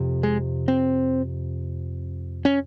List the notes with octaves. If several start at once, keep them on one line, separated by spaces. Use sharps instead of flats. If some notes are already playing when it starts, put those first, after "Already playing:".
Already playing: F2 C3
G#3
C4
C#4